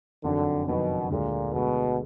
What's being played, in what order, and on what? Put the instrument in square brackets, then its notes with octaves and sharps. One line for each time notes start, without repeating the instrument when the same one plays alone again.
[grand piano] F#1 F2 D#3 F#3 D4 [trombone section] D3
[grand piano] F#1 F2 D#3 F#3 D4 [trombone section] B2
[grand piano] D2 D3 G#3 [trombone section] A#2
[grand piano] D2 D3 G#3 [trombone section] B2